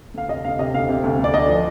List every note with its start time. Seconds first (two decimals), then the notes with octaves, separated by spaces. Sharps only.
0.14 D2 F5
0.29 C3 D#5
0.44 D2 F5
0.59 C3 D#5
0.74 D2 F5
0.89 C3
1.04 D2
1.19 D2
1.24 D5
1.34 D2 D#5
1.48 F3